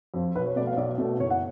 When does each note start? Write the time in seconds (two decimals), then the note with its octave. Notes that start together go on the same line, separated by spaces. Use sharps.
0.14 F2 F3
0.35 B1 B4
0.46 C#5
0.56 B2 A3 D5
0.67 F5
0.77 B1 D5
0.98 B2 A3
1.20 F#1 C#5
1.30 F#5